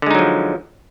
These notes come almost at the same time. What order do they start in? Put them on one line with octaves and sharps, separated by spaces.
D3 G#3 D#4 F#3 F3